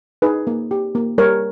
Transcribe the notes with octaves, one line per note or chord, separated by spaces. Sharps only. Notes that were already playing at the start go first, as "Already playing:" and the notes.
D#4 G#4 B4
A#3
G4
A#3
G3 A#4 C#5